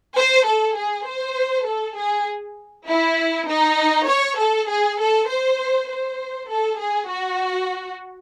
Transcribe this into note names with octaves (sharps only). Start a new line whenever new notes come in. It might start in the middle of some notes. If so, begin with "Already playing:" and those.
C5
A4
G#4
C5
A4
G#4
E4
D#4
C#5
A4
G#4
A4
C5
C5
A4
G#4
F#4